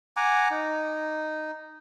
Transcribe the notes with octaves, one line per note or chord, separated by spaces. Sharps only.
F#5 G#5 A#5 D6
D#4